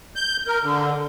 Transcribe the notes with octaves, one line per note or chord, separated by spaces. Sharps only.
G6
A#4
D3